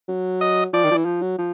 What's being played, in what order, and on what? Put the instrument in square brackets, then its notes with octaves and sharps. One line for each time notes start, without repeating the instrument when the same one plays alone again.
[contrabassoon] F#3
[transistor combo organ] D#5
[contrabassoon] F3 [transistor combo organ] D5
[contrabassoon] D#3
F3
E3
F3
F#3
F3